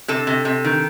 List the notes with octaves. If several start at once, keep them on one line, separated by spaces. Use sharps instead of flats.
C3 A4
C3
C3
D#3